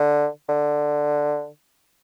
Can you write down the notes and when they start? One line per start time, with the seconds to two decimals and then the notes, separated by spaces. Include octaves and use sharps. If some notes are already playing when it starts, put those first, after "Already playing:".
Already playing: D3
0.49 D3